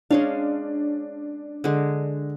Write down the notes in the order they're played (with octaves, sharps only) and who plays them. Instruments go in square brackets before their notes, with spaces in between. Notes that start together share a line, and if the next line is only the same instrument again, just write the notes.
[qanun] G#3 C#4 F5 [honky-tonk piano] D4
[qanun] D3 G#3